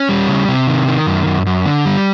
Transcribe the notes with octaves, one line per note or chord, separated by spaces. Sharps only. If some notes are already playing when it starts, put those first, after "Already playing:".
Already playing: C#4
G3
C#3
C3
D#3
D#3
F#2
F#2
F#2
D3
G3